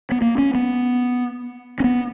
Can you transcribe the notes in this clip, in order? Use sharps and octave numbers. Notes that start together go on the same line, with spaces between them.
B3
A#3
C#4
B3
C#4
B3